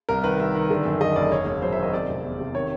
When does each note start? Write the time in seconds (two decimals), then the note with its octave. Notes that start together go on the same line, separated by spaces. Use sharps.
0.09 C2 A#4
0.24 D#3 B4
0.40 C2 E5
0.55 D#3
0.70 D3
0.85 F#2
1.01 D3 D#5
1.16 F#1 D5
1.31 E1 C#5
1.46 E1
1.62 F#3 C5
1.73 D#3 E5
1.83 D#5
1.93 C3 D5
2.09 F1
2.24 E2
2.39 C3
2.55 D#3 C#5